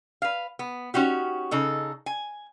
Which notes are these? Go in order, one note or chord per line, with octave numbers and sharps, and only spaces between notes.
B4 F5
B3
C#4 D#4 F#4 G4
C#3 D#4 A4
G#5